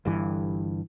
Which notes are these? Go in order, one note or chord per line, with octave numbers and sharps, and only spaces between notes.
G1 G2 E3